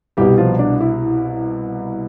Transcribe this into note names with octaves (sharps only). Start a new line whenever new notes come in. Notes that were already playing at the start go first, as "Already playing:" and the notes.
C2 B2 G3 G4
F3 F4
D4
E4